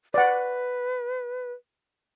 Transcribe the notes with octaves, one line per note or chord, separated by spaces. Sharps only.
B4 D5 F#5